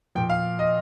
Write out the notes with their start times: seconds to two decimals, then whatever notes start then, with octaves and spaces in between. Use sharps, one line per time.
0.15 A#2 F3 G5
0.30 F5
0.59 D#5